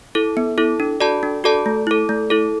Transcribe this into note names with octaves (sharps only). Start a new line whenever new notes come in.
E4 A4
B3
E4 A4
D4
F#4 A4 D5 A5
D4
F#4 A4 D5 A5
A3
E4 A4
A3
E4 A4